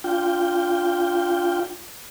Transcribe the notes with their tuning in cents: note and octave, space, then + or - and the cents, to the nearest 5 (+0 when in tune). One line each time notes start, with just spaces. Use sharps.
D4 -25 F4 +0 G5 +0